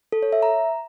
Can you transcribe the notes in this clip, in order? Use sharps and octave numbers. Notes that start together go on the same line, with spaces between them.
A4
C#5
E5
A#5